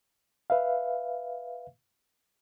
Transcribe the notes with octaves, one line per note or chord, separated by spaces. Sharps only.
B4 E5 F5